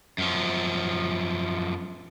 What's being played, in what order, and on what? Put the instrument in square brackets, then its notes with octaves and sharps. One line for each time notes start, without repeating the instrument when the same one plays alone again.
[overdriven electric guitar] F#2 F3